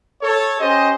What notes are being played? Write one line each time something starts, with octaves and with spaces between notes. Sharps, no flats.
A4 C#5
C#4 G4 C5 D#5